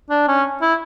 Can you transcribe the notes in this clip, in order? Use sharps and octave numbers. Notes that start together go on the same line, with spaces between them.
D4
C#4
E4